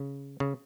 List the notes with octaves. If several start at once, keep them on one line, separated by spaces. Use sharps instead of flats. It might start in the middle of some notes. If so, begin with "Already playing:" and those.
Already playing: C#3
C#3